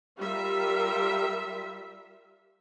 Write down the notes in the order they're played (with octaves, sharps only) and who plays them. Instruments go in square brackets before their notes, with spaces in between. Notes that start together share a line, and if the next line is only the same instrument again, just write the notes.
[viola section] G3 F4 A#4 E5